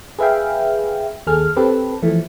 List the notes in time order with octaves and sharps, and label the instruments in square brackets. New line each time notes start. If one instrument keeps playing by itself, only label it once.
[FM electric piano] G#4 B4 E5 F5 G5
D#2 G#4 A4 F6
C4 G4 A4 B4
E3 F3 A3